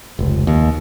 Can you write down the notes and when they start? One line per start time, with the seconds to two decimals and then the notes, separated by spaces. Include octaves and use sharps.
0.19 F1 C#2
0.47 D#2